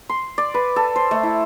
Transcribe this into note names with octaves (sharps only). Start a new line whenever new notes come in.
C6
D5
B4
A4
C5
A3
E4